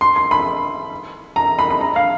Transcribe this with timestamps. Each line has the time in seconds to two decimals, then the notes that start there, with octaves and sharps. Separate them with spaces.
0.01 C6
0.16 C6
0.31 B5
1.36 A#5
1.59 B5
1.70 B5
1.81 A#5
1.96 F5